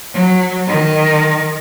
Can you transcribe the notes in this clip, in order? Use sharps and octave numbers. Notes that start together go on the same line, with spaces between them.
F#3
D#3